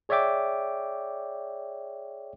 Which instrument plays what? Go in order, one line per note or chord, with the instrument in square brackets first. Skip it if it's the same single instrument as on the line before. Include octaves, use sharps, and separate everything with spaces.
[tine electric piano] G#4 C#5 D5 E5 G5 D6